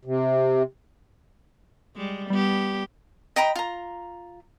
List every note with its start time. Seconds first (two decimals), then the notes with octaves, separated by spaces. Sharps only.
0.05 C3
1.96 G3 G#3
2.30 G3 B3 G4
3.36 D#5 G5 A#5 B5
3.56 F4 A#5